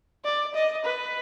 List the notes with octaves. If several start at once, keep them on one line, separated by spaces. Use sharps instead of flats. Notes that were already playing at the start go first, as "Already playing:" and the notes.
D5
D#5
B4